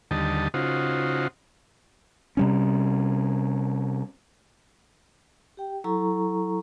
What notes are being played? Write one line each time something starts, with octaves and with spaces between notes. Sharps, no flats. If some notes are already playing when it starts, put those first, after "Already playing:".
D#2 D3 G3 D#5 A5
C#3 D#4 F4 F#4 C5
C3 G3 C#4
G4 G5
F#3 E4 A4 A#5 C#6